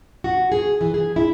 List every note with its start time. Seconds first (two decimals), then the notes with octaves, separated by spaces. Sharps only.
0.24 F#4
0.52 G#4
0.81 E3
0.94 G#4
1.16 E4